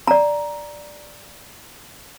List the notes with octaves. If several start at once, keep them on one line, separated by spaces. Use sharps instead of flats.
D5 A#5